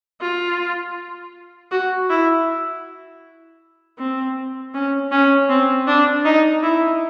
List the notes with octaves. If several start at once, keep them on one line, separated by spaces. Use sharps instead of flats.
F4
F#4
E4
C4
C#4
C#4
C4
D4
D#4
E4